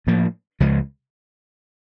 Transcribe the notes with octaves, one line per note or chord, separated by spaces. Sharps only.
A2 F3 A#3
C#2 C#3 F3 G#3